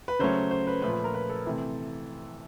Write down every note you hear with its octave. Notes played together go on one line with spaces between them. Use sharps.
B4
C#3 F#3 A3 C#4 C5
C5
B4
A#2 F3 A3 C#4 B4
B4
A#4
B4
A4
C3 E3 A3 C4